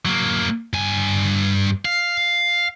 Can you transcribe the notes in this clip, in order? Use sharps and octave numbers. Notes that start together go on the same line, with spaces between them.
F#3 A#3
G2 G#5
F5